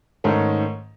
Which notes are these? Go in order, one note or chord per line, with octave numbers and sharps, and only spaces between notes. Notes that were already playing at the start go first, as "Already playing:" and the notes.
G#2 D#3 A3 C#4